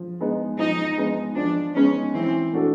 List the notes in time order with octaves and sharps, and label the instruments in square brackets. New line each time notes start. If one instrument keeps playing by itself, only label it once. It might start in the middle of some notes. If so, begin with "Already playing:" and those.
Already playing: [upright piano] F3
G#3 B3 D#4
[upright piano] F3 [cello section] D#4
[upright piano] G#3 B3 D#4
[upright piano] F3 [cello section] D4
[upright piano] G#3 B3 D#4 [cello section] C#4
[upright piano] E3 [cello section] C4
[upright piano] A3 D4 F#4 A4